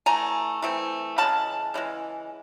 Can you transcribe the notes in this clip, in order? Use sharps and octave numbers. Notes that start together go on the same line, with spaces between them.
E3 A3 G#5 A#5
E3 A3 C4
C#3 E3 G#3 A5 B5
C#3 E3 G#3